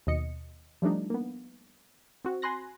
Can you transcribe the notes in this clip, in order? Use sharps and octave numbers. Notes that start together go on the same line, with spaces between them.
D#2 B2 D#5 C#7
F3 G3 A3 D4 D#4
A#3 B3
C4 F#4
G#5 B5 C6 F#6 A#6